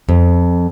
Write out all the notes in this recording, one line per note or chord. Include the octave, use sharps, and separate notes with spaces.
F2